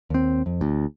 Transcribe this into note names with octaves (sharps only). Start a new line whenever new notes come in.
D#2 C4
F2
D2